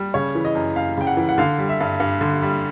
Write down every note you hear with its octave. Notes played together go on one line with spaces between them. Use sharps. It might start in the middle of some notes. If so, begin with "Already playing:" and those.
Already playing: G3
C#3 C#5
E3
D#5
F#2
F#2 F5
C#3 G5
F#5
E3
F#5
D3 F5
G3
E5
G2
G2
D3
G3